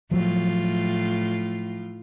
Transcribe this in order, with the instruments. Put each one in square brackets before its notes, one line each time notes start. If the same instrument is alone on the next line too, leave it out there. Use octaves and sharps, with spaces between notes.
[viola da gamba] A2 F4 [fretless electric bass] F3 F#3